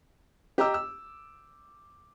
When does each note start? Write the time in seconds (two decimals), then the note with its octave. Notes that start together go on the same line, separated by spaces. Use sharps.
0.58 G4 D#5 A#5 D6 E6
0.74 E6